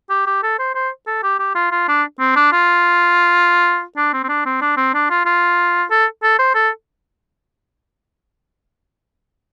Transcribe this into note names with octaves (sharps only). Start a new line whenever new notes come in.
G4
G4
A4
C5
C5
A4
G4
G4
F4
F4
D4
C4
D4
F4
D4
C4
C4
D4
C4
D4
C4
D4
F4
F4
A4
A4
C5
A4